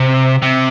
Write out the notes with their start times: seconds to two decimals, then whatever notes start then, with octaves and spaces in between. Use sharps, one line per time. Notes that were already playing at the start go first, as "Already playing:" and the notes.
Already playing: C3
0.42 C3